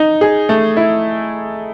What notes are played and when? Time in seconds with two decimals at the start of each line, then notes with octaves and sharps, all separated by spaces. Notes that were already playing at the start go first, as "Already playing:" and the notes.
Already playing: D#4
0.21 G#4
0.49 A3
0.77 E4